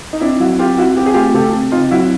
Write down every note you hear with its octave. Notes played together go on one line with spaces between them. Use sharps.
D#4
C4 D4 E4
F#3 E4 F#4
C4 F4 G4
C4 E4 F#4
C4 G4
G#4
A3 F4 G4
C#3 G4 A4
C4
C4 D#4 F4
F#3 E4 F#4